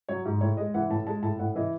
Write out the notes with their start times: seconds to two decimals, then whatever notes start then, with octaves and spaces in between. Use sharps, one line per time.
0.09 F#3 C#5
0.26 G#2
0.41 A2 C#5
0.57 G#3 D#5
0.74 E3 F#5
0.90 A2 A5
1.07 G#3 A5
1.22 A2 A5
1.39 A2 F#5
1.56 E3 D#5